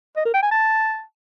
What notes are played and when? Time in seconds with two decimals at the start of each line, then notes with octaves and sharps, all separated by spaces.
0.16 D#5
0.25 A#4
0.34 G5
0.42 G#5
0.51 A5